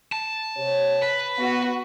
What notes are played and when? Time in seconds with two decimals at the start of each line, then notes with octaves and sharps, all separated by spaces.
0.12 A5
0.57 C3 C#5
1.02 B4
1.39 B3 F#4